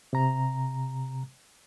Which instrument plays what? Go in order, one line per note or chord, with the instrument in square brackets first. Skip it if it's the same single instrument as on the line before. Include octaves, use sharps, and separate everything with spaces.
[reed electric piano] C3 A#5